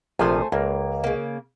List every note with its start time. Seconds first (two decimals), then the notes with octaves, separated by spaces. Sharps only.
0.19 A#1 C3 F3 A3 C5 G#5
0.52 C#2 A#3 A#4
1.04 C#3 A#3